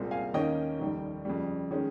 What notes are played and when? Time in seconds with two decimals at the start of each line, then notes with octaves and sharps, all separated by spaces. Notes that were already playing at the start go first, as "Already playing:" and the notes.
Already playing: C2 A#2 G#3 C4
0.11 F5 G#5
0.34 D#2 D#3 A#3 C#4 D#5 G5
0.79 F1 D#2 D#3 G3
1.25 F2 C#3 G3
1.71 D#3 G#3 C#4